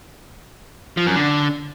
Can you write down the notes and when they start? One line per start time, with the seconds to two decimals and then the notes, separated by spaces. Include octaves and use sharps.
0.97 F3
1.06 F#2
1.16 D3